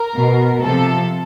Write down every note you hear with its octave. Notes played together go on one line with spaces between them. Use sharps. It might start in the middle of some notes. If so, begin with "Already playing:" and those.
Already playing: A#4
B2
C3 F3 A4